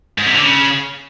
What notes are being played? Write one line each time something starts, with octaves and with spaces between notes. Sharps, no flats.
G#2
C3
D3
C#3